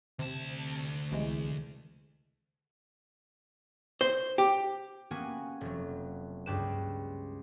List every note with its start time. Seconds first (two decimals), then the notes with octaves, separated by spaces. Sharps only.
0.19 D2 C3 A5
1.11 C2 E3 G#3
4.01 C5
4.38 G4
5.11 A#3 B3 C#4 F#4 G4 G#5
5.61 F1 F#3
6.46 C#2 G2 G4 B4 E7